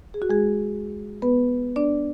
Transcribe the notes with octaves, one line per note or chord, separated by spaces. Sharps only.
G#4
F#4
G#3 G#4
B3 B4
D4 D5